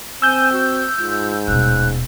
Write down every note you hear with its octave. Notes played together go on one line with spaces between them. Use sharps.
C4 G#5 E6 G6
F#4
G#2 F4
D#1 B2 F#6